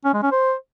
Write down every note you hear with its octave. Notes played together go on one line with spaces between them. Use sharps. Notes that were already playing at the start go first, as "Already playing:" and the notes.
C#4
G#3
C#4
C5